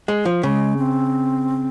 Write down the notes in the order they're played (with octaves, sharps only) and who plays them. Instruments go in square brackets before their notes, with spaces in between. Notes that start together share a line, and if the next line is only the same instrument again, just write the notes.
[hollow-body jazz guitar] G#3
F3
[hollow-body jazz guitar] C#3 [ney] G#3
[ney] C4